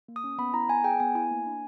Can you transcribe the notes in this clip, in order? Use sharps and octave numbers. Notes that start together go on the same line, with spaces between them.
A#3
D#6
C#4
B3 B5
E4 A#5
B3 G#5
G#4 G5
B3 G#5
E4 G#5
A#3
D4